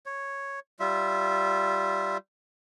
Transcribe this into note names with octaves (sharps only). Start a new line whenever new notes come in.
C#5
G3 F4 E5